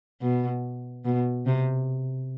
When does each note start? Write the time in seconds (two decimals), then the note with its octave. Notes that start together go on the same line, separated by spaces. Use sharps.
0.22 B2
1.05 B2
1.46 C3